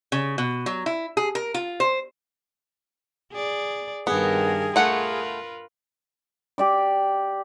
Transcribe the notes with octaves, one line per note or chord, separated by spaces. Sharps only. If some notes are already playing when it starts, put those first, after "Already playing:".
C#3
B2
F#3
E4
G#4
A#4
F4
C5
G#4 D5
G2 D#3 B3 G#4 A#4
A3 F4 A#4 B4 F#5
G4 D5 D6